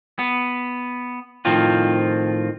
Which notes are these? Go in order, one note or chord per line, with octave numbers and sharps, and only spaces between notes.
B3
A2 D#3 F3 C4 F4